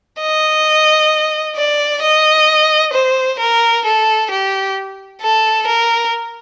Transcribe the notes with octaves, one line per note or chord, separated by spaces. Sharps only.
D#5
D5
D#5
C5
A#4
A4
G4
A4
A#4